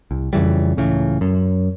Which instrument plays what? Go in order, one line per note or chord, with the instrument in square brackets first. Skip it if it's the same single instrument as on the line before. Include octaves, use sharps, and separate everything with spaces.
[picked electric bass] C2
F2 C#3 E3 G3
C#2 A2 C#3 E3
F#2